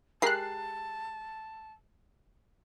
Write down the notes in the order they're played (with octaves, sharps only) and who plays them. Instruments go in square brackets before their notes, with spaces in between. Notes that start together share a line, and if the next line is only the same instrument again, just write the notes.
[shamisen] G#3 G4 A#4 [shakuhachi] A5 [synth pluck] F#6 C7